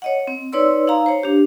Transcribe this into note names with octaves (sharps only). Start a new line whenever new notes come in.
C#5 D#5 F#5
C4
D#4 B4 C#5 D5 C6 E6
D#4 F5 A#5
C5 C#5
D4 G4